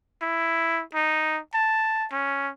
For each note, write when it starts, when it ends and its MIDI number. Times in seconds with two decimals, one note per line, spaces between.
0.22 0.82 64
0.94 1.39 63
1.54 2.06 81
2.12 2.50 61